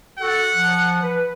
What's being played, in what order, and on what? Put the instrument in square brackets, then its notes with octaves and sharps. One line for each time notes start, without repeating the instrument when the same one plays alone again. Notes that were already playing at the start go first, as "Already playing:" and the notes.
[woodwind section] F#4 A4 [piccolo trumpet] F#5
[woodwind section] F3
B4